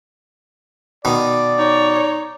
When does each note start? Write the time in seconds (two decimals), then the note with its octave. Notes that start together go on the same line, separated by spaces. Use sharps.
1.05 B2 D#3 D5
1.58 D#4 C#5